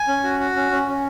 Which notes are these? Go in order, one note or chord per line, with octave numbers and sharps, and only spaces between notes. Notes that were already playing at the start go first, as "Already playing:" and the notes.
Already playing: G#5
C#4
F#4
F#4
C#4
C#4
C#4